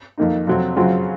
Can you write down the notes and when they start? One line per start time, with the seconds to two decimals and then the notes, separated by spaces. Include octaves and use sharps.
0.18 F2 D#3 A#3 D#4
0.47 F2 C3 F#3 C4
0.76 F#2 C#3 F#3 C4 F4